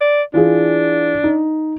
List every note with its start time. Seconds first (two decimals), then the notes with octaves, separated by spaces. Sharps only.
0.01 D5
0.34 E3 D4 F4 G#4
1.24 D#4